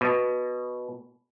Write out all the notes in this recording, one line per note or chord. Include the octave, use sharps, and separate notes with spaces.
B2